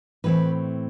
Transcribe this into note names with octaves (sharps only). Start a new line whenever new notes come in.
A2 E3 A3 C4 B4